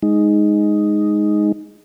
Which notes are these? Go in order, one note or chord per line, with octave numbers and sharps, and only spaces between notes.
G#3 D#4